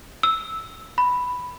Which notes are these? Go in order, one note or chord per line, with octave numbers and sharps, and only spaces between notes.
E6
B5